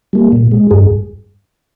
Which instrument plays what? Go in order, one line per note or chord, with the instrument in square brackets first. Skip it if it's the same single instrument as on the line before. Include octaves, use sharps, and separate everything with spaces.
[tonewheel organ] G3 A#3
A#2
G#3
G2 G#4